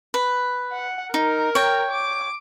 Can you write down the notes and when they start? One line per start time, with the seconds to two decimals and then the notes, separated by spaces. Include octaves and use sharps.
0.14 B4
0.72 F#5
1.14 D#4 A#4
1.55 C#5 G5
1.91 D6